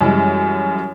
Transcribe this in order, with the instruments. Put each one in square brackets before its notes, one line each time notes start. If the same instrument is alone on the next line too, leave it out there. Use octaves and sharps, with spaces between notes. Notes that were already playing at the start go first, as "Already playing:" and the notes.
[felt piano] F#2 E3 G3 G#3